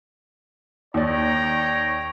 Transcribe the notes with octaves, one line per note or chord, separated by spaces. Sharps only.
D#2 C#5 D5 G5 A#5